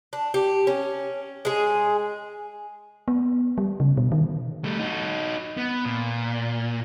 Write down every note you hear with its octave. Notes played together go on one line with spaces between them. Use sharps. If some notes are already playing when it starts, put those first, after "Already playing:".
D4
G4
C#4
G#3 G#4
B3
G3
C#3
B2
D#3
G3 A3
D#4 F#4
B3
A#2